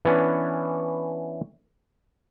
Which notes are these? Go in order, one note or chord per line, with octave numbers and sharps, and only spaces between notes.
E3 B3 C#4 D4